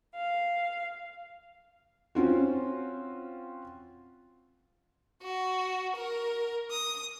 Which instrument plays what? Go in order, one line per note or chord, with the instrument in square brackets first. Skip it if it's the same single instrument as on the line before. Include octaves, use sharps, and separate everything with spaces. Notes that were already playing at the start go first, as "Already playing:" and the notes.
[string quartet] F5
[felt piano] C4 C#4 F4 F#4
[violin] F#4
A#4
D#6